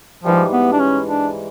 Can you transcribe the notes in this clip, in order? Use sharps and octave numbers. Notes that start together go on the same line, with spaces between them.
G#2 E3 F3 G3
B3
D4
C#4
D4